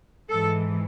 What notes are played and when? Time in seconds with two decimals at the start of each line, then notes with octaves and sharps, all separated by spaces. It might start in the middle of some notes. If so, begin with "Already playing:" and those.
0.29 G#2 E3 A4